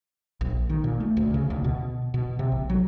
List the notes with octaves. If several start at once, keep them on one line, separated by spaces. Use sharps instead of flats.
A#1
D#3
A#2
A3
D2
C#3
D2
B2
B2
C3
A#1
F#3